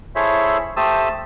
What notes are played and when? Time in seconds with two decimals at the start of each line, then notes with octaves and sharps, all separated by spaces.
0.15 E4 G#4 A4 C5 C#5 E5
0.77 A3 G4 C5 A5 D#6 E6